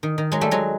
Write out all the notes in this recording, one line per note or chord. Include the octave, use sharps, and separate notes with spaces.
D#3
D#3
F#3 G#3
G3 A3
F#3 G#3